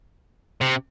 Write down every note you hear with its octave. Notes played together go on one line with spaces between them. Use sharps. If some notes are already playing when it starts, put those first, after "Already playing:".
C3